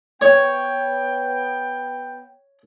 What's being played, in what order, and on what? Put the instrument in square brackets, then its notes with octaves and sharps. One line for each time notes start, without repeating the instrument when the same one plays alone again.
[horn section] B3 G5 [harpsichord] C#5